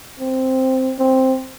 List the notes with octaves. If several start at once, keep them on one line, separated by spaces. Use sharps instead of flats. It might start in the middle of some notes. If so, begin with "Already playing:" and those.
C4
C4